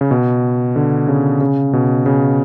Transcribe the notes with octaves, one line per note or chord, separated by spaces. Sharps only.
C#3
B2
D3
C#3
C#3
B2
C#3